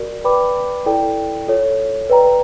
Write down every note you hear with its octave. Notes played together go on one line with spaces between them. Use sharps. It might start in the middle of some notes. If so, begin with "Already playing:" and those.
Already playing: F#4 A#4 D5
B4 D5 G5 B5 D6
E4 A4 D5 G5
F4 A4 C#5
B4 D5 G5 A#5